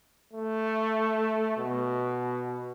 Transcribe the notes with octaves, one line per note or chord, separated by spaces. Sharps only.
A3
B2